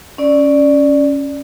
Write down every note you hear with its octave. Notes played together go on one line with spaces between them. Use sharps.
C#4 D5